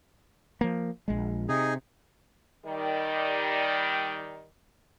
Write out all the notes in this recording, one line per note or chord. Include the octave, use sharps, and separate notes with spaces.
F3 A#3
A#1 G#3
C3 D#4 G#4
D#3 G3